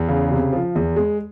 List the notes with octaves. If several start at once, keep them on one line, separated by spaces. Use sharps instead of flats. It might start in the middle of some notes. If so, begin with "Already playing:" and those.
Already playing: E2
C#3
C3
F3
E2
G#3